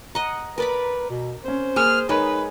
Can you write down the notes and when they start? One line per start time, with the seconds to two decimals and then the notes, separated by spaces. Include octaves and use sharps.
0.15 D#5 F#5 A#5
0.58 A#4 B4 D5 B5
1.10 B2
1.44 C4 C#4 C5
1.76 A#3 G#4 F6
2.09 G#3 D#4 A#4 B4 C#5